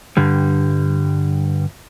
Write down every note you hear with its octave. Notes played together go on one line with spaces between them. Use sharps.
G2 D3 G3